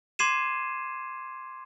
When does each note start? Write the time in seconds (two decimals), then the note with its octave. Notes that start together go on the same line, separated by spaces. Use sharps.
0.19 C6 D6 G#6 C7 D#7 E7